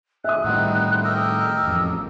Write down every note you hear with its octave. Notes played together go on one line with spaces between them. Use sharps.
E5 D#6 F#6
A2 D#3 G3 B3 C4 D#4
G4 A#4 D#5 E6
A1 F2